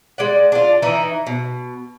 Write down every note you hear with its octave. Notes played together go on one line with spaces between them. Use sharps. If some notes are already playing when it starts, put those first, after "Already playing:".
G#3 D5 F#5
D4 F4
E3 D#4 E4
B2